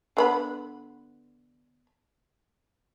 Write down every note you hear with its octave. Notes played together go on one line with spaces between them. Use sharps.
D3 B3 B5